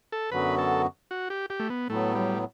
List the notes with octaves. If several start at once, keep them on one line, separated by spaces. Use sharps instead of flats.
A4
F#2 D3 F#3 B3 F#4 B4
A4
F#4
G4
G4
A3
B3
A2 F#3 A3 B3
G3